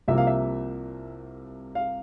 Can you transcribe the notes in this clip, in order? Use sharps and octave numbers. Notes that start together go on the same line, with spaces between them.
C2 C3 F3 A#3 E5
F5
E5
F5